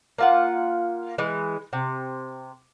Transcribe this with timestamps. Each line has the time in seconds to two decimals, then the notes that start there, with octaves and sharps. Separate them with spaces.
0.18 A#3 F4 F#5
1.18 E3 G#3
1.73 C3